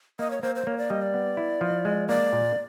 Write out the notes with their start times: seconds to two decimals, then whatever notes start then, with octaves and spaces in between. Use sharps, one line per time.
0.19 A#3 D#5
0.31 C#5
0.42 A#3 C5
0.55 C5
0.67 A#3 C#5
0.78 D5
0.90 G3 D#5
1.02 D5
1.14 B3
1.37 E4
1.61 F3
1.85 G#3
2.08 A#3 D5
2.33 A#2